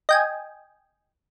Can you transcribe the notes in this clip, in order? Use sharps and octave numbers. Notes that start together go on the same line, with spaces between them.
D#5 G5 G#5